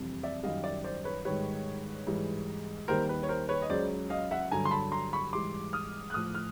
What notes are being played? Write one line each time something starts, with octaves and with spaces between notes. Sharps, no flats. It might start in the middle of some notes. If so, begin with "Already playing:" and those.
Already playing: F2 C3 E3 G3
D5 E5
F#2 D#3 G3 D#5 F5
D5 E5
C5 D5
B4 C#5
G#2 D#3 G3 B4 C#5
G#2 E3 G3
D#2 D#3 G3 A#4 C5
B4
C#5
A#4 C5
B4 C#5
D#5
C#2 C#3 F#3 C5 D5
D#5 F5
E5 F#5
G2 D3 F#3 G#5 A#5
C6
A5 B5
A#5 C6
B5 C#6
G#2 E3 G3 C6 D6
D#6 F6
F#6
A2 F3 D#6 F6
F6